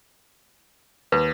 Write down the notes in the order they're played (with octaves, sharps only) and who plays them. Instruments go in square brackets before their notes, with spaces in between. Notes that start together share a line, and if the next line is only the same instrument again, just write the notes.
[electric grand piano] D#2 [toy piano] B4